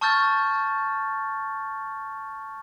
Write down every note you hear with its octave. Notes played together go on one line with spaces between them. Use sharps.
A5 C#6 E6 F6 G6 A6